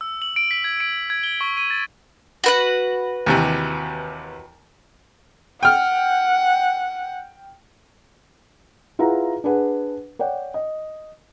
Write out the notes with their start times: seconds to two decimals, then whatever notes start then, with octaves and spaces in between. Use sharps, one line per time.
0.01 E6
0.22 F#7
0.36 D7
0.51 B6
0.64 G#6
0.80 D7
1.10 G#6
1.24 G7
1.41 C#6
1.57 D#7
1.70 A6
2.44 F#4 B4 F#5
3.26 D#2 C3 E3
5.63 F#5 G5 F6
8.99 E4 F4 G#4 B4 F#5 A#5
9.44 D4 G#4 B4 F#5
10.19 C#5 D5 F#5 G5
10.54 D#5